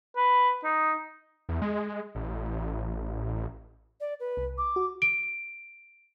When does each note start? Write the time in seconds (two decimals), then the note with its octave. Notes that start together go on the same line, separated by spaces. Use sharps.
0.17 B4
0.64 D#4
1.49 E2
1.62 G#3
2.15 A1
4.00 D5
4.20 B4
4.37 C2
4.58 D6
4.76 F#4
5.02 D7